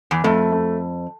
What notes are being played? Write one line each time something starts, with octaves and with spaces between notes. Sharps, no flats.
E2
F2 A3
A3